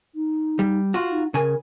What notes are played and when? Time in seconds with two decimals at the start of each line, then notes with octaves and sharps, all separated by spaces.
0.15 D#4
0.59 G3
0.94 F4 F#4
1.11 D#4
1.34 C#3 A#4 G#5